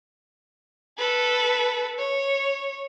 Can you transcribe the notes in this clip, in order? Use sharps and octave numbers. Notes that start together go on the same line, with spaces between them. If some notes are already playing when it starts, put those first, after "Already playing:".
A4 B4
C#5